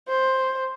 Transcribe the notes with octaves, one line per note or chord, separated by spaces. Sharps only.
C5